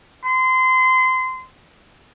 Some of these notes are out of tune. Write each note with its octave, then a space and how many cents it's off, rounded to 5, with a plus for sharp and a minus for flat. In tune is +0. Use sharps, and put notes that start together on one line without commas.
C6 -25